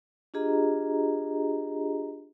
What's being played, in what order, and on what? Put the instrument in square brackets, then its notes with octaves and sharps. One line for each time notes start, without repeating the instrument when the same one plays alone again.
[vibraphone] D4 F4 G4 G#4 D#5 A#5